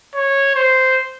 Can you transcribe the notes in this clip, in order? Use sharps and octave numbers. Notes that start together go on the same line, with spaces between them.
C#5
C5